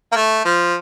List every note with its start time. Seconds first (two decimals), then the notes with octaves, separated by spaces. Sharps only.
0.12 A#3
0.15 A3
0.45 F3